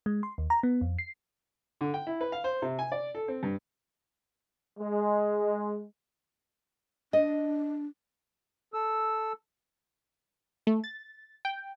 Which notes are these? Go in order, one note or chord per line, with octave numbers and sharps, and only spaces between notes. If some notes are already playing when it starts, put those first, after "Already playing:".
G#3
C6
D#2
A#5
B3
F2
C7
D3
G5
E4
B4
F5
C5
C3
G#5
D5
A4
C4
G2
G#3
D4 D#5
A4 E6
A3
A6
G5